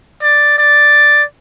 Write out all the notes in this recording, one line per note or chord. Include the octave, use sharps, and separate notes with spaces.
D5
D5